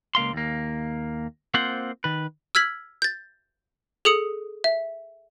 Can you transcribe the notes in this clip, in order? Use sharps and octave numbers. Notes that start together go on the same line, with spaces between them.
C#2 A#3 F5 C6
D#2 A#3
A#3 C4 F4 C5 F#5
D#3 B4
E6 F6 G#6 B6 F#7
G6 A6
G#4 A4 D#6 C#7
E5